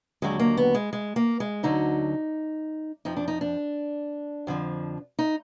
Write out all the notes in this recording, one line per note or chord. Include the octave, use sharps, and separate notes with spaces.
D#2 D3 F#3 G#3
A#3
B3
G#3
G#3
A#3
G#3
D2 D3 F#3 D#4
F2 F3 D#4
D4
D#4
D4
F2 D3 F3
D#4